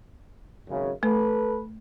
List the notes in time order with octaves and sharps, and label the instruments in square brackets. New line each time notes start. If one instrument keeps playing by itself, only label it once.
[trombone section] G#1 F#2 C#3
[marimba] A3 [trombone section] A4 B4